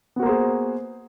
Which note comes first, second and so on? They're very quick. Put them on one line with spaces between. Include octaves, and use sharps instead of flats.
B3 F#4 A#3 C5 G#4